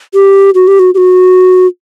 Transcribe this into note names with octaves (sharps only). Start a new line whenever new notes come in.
G4
F#4
G4
F#4
G4
F#4